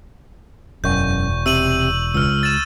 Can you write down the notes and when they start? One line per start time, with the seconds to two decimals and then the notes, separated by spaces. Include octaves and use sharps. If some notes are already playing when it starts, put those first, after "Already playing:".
0.84 E1 F#2 C#6 G6
1.46 C3 E6 D#7 F#7
2.14 C#2 E6 F6
2.43 A6 E7